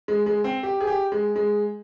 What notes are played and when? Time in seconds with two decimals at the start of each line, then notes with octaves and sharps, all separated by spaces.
0.08 G#3
0.26 G#3
0.44 C4
0.63 G4
0.80 G#4
0.87 G4
1.12 G#3
1.36 G#3